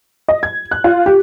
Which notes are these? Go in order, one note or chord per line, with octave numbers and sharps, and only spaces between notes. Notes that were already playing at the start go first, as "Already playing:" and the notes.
D#5
G#6
F#6
F4
G4